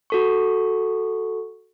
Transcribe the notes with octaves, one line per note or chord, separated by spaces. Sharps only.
F#4 A4 C#6